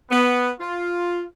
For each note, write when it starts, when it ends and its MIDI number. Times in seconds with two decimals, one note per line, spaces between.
0.11 0.50 59
0.59 1.23 65